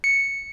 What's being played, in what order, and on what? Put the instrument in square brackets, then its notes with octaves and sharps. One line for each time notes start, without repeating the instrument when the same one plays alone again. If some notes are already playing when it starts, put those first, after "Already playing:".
[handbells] C#7